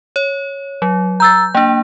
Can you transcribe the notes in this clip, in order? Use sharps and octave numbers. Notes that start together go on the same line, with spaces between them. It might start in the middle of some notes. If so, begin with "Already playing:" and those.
C#5
F#3
A#5 E6 G6 A6
A#3 D4 G5